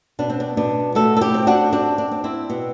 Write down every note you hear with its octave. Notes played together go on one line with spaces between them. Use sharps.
B2 D4
C4
D4
B2 D4
A3 F#4 A4
A4
E4 G4
C4
D4 F#4
C4 D4
D4
C4
C4 E4
B2